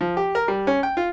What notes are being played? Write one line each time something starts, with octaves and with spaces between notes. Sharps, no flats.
F3
G4
A#4
G3
C#4
G5
F4